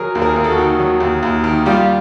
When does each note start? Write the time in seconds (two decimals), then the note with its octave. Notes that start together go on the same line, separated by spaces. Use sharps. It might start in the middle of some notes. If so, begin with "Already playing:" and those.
Already playing: F#3 G#4 A#4
0.15 D#2
0.22 G#4 A#4
0.36 D#2
0.44 A4
0.50 F#4 G#4
0.58 D#3
0.80 F#3
1.00 D#2
1.23 D#2
1.44 D#3
1.66 G3 F4 G4